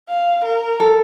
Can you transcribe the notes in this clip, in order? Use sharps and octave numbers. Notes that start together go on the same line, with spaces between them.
F5
A#4
A4